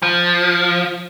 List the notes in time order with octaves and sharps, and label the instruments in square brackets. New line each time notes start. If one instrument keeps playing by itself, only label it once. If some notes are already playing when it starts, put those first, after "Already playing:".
[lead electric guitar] F3